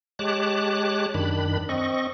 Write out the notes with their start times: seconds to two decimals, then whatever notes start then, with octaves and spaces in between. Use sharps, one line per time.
0.19 G#3 G4 C#5 A5 D6 F#6
1.14 F#2 D#3 D4 B5
1.69 C4 D#5 C#6